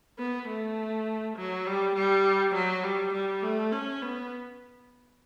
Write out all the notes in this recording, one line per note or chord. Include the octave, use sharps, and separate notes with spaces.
B3
A3
F#3
G3
G3
F#3
G3
G3
A3
C#4
B3